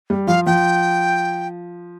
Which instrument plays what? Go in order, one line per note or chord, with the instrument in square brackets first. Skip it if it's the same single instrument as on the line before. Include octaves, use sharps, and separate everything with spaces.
[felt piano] G3
[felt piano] F3 [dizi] F5
[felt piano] F3 [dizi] G5